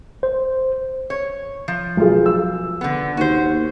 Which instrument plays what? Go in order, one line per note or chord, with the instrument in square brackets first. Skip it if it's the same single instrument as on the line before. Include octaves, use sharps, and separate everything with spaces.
[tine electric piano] C5
[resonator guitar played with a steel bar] C#5
F3
[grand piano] B1 F4 G#4
E6
[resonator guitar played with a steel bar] D3 B3
[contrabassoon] D#2 [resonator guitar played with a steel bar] F#4 C5